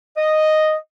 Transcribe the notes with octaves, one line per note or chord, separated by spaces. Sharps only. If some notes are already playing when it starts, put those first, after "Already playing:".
D#5